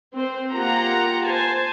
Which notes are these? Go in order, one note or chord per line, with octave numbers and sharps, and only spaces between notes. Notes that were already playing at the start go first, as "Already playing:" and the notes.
C4 C5
A#3 F4 G4 F#5 A#5
C5 G#5 A5